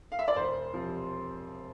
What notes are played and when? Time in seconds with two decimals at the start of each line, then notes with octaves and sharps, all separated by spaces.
0.12 F5
0.19 E5
0.28 D5
0.35 E1 C5
0.73 C3 F3